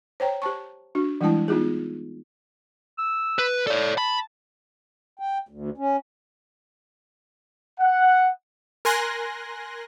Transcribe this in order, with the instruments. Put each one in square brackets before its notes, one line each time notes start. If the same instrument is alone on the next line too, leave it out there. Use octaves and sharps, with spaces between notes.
[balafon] C5 C#5 G5 A#5
G4 C5 A5 C#6
D4 F#4
E3 G3 G#3 D4 E4 A5
B3 D#4 F4 G4 G#4
[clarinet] E6
[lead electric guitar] B4
[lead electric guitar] A4 C#5 [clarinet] D5
[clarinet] A5 [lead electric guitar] B5
[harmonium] G5
D2
C#4
[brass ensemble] F#5
[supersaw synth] A#4 G#5 C6 F#6 A#6